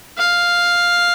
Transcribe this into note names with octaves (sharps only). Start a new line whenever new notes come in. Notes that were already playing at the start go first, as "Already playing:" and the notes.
F5